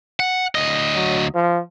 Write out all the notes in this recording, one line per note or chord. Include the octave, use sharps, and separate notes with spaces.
F#5
D2 D#5
F#3
F3